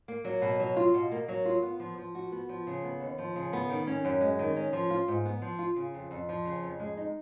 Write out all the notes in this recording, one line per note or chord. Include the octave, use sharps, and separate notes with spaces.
A#3
F#3
B2
F#3
F4
B2
A#3
F#3
F4
B3
F3
F3
F#4
B3
F3
C#3
B3
D#2
F3
C#3
B3
D#3
C#4
F#2
G#3
D#3
C#4
F3
F4
G#2
B3
F3
F4
C#3
F2
F2
F3
C#3
F2
G#3
D#4